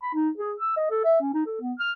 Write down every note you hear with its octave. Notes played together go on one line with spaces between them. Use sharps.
B5
D#4
G#4
E6
D#5
A4
E5
C#4
D#4
A4
B3
F6